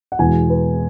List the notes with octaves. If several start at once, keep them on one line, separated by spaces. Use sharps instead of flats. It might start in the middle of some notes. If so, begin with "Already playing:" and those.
F#5
E2 B2 G#3 G#5
B4